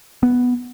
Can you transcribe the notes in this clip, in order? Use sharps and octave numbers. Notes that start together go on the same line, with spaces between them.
B3